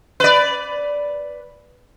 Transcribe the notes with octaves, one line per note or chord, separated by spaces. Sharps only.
B4 D5